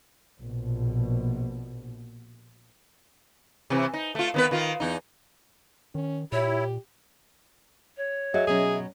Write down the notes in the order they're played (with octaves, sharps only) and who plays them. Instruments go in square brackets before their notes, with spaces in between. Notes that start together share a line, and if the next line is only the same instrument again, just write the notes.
[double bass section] A#1 B2
[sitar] C3 E3
D#4
A3 F4
D#3 B3 B4
D#3 F4
E2 D#4
[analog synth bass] D#3 [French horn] C#4
[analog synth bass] A#2 [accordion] E4 [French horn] G4 [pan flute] C#5
[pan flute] C#5
[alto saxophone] F#3 [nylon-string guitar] G#4 [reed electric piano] D#5 E5
[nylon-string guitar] B2 F#3 C#4 [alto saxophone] G#4